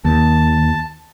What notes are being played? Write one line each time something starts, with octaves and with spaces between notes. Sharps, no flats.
D#2 A5